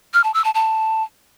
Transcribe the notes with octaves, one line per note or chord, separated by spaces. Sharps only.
F6
A5
E6
A5
A5